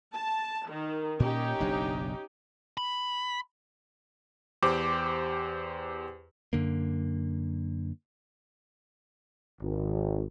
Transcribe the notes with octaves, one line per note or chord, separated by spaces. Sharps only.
A5
D#3
A#2 C#4 D#4 G4
F#1 B1 D4
B5
E2 G4 C5 D6
F#2 D3 A#3
G#1